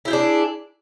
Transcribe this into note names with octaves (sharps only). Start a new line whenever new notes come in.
D4 E4 G4 G#4